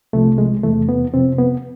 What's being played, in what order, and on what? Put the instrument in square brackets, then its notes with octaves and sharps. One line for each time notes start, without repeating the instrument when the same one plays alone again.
[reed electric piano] C2 C3 F3 A3
G#3
E2 C3 E3 A3
B3
F2 C3 F3 C4
B3